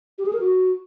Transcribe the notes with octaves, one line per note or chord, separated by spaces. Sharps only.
G4
G#4
A#4
F#4